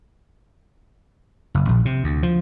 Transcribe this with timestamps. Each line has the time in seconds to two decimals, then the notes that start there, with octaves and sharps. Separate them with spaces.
1.54 F#1
1.69 A#1
1.85 C3
2.04 D2
2.23 F3